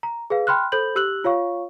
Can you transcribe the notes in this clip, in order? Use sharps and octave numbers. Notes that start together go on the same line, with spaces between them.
A#5
G#4 B4 F5
G5 B5 C6 F6 F#6
A4 C5 B5 G6 F#7
G4 E6 F#6 F#7
F4 C#5 F5 C#6